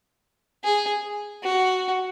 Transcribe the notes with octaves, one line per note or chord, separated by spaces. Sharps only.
G#4
F#4